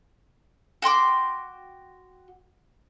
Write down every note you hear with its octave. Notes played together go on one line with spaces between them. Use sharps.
F#4 G5 C6 D6